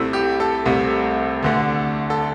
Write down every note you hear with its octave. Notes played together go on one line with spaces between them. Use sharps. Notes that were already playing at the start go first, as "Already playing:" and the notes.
Already playing: C2 C3 A3 E4
G4
A4
C2 C3 A3
D2 D3 A3
A4